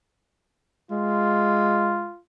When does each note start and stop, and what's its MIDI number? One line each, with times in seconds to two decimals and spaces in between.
0.91 2.10 56
0.91 2.20 65